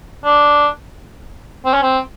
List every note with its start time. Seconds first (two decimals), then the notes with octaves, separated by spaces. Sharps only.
0.25 D4
1.65 C4
1.73 C#4
1.82 C4